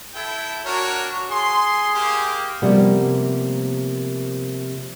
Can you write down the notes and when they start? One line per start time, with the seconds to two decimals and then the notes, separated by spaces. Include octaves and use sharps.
0.15 E4 A4 G5
0.65 D4 F#4 A#4 C#5
1.30 G#4 C6
1.95 A#3 G4
2.62 C3 F3 G3 A#3 B3